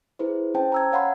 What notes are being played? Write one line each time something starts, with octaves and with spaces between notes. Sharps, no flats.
E4 G#4 B4 C5
C#4 C5 G5 A5
A#5 E6 G#6
C#5 F5 F#5 B5 C6